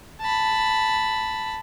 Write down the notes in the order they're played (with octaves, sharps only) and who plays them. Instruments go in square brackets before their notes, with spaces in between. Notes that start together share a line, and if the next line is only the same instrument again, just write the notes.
[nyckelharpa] A5 B5